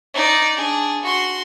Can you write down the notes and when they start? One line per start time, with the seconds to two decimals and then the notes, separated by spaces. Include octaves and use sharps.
0.14 D#4 D5
0.57 D4 G#4
1.03 F#4 C6